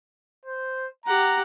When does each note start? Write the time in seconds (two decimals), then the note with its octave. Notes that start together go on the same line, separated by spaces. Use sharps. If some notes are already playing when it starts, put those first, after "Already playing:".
0.45 C5
1.06 G4 F#5 A#5